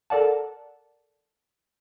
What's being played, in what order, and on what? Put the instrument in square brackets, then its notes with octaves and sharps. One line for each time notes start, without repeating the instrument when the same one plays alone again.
[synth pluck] A4 A#4 D5 F#5 A5